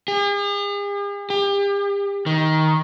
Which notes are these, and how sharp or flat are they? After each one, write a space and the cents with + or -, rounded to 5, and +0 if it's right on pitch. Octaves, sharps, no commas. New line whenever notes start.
G#4 -45
G4 +35
D#3 +10